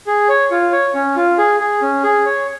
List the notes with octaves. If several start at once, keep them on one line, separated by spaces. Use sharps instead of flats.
G#4
C#5
F4
C#5
C#4
F4
G#4
G#4
C#4
G#4
C#5